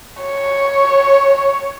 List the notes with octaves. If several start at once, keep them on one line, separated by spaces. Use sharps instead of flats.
C#5